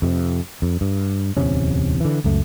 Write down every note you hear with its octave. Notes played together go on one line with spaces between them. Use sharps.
F2 C3
F2
G2
D1 E2 C3 C#4
D3 E3
C#2 F#2 A3